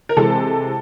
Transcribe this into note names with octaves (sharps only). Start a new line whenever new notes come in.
A#4
C3 E3 G#3 C4 A4